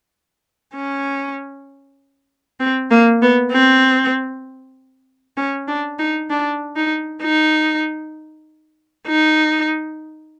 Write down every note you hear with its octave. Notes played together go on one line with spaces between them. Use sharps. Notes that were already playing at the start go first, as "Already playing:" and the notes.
C#4
C4
A#3
B3
C4
C#4
D4
D#4
D4
D#4
D#4
D#4